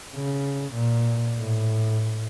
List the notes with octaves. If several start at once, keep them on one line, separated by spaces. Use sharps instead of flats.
C#3
A#2
A2